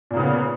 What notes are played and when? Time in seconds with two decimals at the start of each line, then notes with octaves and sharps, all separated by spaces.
0.11 A#2
0.14 A#3
0.17 C#3
0.20 B3